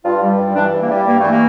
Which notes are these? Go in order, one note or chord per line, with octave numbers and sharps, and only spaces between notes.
G2 F4
G3
G2
E3 D4
G2
A#3
G3
G2 A#3
E3 A3
A#3